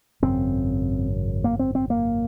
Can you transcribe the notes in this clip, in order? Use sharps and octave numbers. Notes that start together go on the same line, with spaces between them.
G#1 F#2 C#3 C4
A#3
C4
C4
A#3